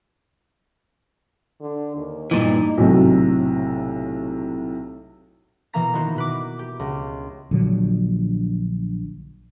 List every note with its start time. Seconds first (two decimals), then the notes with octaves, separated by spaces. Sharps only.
1.61 D3
1.96 D#2
2.31 G2 A#2 E3 D#4
2.78 B1 A2 C3 F#3 A3
5.73 B2 E3 A#3 B3 A#5 A#6
5.93 D#3 B3 D#4 E4 F#4 C5
6.16 B2 B4 D6
6.59 G4
6.80 C#2
7.51 A#1 D3 F#3